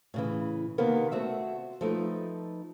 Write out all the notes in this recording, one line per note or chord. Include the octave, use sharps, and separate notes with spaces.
A2 C#3 E3
C3 D#3 A#3 B3
A3 C4 F#4 E5
F3 A3 D#4 B4